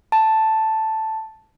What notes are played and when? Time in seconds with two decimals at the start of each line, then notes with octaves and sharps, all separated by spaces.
0.12 A5